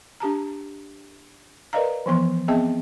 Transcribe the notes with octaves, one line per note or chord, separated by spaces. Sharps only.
D4 G4 A5 A#5
A#4 B4 D5 D#5 F5 A#5
E3 F3 B3 C6
B3 C4 G#4 D#5 E5 A5